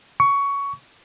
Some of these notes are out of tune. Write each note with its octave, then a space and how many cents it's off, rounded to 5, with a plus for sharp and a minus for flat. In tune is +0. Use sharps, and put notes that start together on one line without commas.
C#6 +15